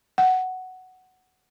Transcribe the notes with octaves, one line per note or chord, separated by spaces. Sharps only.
F#5